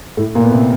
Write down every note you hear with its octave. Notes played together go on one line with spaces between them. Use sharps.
A2 A3
A#2 A#3
B3
C3 C4